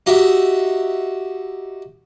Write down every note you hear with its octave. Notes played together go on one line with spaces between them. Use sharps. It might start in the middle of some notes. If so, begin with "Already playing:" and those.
D#4 F#4 G4 E5